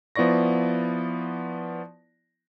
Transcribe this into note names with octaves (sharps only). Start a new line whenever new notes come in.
F3 B3 E4 D5 C#6 A#6